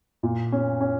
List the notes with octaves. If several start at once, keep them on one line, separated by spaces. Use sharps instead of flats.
A#2
C#4
C#4